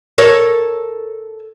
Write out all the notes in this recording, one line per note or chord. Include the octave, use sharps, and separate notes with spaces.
A4 A#4 C#5